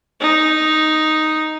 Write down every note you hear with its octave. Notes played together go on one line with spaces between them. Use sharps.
D#4